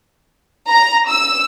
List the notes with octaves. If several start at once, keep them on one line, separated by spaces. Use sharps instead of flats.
A#5
E6